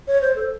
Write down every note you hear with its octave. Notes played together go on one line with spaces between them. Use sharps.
C#5
C5
A4